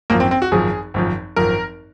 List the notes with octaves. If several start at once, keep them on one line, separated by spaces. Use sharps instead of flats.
G#1 F#2 F3 A#3
C4
C4
F#4
G#1 F#2 F3 G#4
G#1 F#2 F3
G#1 F#2 F3 A#4